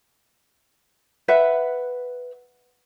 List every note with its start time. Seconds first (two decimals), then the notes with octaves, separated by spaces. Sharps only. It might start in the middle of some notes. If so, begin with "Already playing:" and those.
1.28 B4 E5 F#5